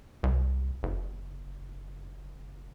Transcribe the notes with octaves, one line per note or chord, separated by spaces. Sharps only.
C2
F#1